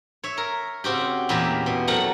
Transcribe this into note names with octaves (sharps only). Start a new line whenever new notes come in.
C#5 E5
A#4
C#3 C4 F#4 G4
E2 A#2 E4 G4 A#4 E5
B2
C3 F#3 A3 A#4 F#5